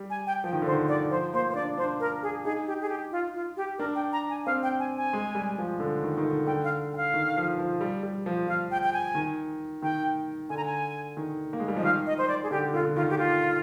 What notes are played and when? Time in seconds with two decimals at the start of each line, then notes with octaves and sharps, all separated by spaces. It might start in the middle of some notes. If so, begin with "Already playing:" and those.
Already playing: G3
0.10 G#5
0.27 G5
0.43 F3 G5
0.53 D#3
0.62 D3 C5
0.72 D#3
0.88 D5
1.10 F3 C5
1.33 A#3 C5
1.51 C5
1.55 D4 D5
1.78 D4 C5
2.00 A#4
2.22 G#4
2.45 D#4 G#4
2.67 G4
2.81 G#4
2.89 G4
3.12 F4
3.34 F4
3.57 G4
3.78 D4 A#4
3.95 G5
4.12 A#5
4.30 G#5
4.46 C4 F5
4.63 G5
4.80 G#5
4.97 G#5
5.13 G#3
5.35 G3
5.58 F3
5.80 D3
6.03 D#3
6.18 D#3
6.25 D3
6.47 D3 G5
6.64 F5
6.94 G5
6.97 F5
7.14 D#3
7.37 F3
7.58 F3
7.81 G3
8.03 G3
8.26 F3
8.48 F3 F5
8.71 G5
8.83 G5
8.93 G#5
9.15 D#3
9.82 D#3 G5
10.50 D3 G#5
10.57 A#5
10.65 G#5
11.17 D#3
11.53 A#3
11.60 G#3
11.68 G3
11.76 F3 D#5
11.83 D#3 F5
12.07 D#5
12.18 C5
12.28 D5
12.43 G#4
12.51 D3 G4
12.73 D3 F4
12.85 D3
12.96 D#3 F4
13.10 G4
13.18 F4